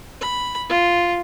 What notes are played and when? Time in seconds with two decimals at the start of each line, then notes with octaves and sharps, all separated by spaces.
0.21 B5
0.69 F4